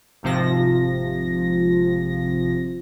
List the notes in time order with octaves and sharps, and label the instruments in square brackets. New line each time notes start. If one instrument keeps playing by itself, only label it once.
[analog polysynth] G#1 C3 F3 A#6